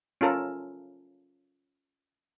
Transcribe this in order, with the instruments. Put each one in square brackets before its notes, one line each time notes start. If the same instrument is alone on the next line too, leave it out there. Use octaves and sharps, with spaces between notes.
[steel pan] C#4 F4 A4 A#4